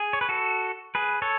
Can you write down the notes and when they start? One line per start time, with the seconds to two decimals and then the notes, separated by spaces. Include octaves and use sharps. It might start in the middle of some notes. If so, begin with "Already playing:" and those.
Already playing: G#4
0.13 C#5
0.21 B4
0.29 F#4 A4
0.95 G#4 B4
1.22 A4 C#5